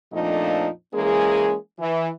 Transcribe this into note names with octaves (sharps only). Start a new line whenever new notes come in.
F2 A#2 F3 A3 D4 D#4
E3 G#3 A#3 C#4 G#4
E3